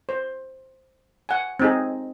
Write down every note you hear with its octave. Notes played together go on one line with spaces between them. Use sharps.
C5
F#5 G#5
C4 D#4 G#4